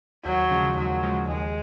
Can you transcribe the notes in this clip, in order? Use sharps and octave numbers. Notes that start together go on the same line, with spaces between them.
D#2 F#3
C#3 F3 G#3
D#2 F#3
C#3 F3 G#3
D#2 G#3